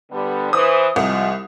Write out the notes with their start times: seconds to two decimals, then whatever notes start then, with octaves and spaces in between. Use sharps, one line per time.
0.11 D3 G3 B3
0.53 E3 B4 C5 D#6
0.96 C2 C3 F3 G#3